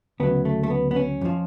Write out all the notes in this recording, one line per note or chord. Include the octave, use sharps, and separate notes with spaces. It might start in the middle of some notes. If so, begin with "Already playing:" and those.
D2 C#3 F#3 B3
A3
A3
B3
B3
C#4
F2 F3